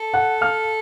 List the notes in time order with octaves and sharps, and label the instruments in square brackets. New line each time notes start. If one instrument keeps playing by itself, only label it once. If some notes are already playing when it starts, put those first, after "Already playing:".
Already playing: [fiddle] A4
[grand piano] F#5 F#6
F5 F6